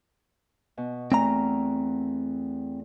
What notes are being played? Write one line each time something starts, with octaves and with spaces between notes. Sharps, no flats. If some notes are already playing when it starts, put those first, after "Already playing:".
B2
E2 A3 C4 A#5 F6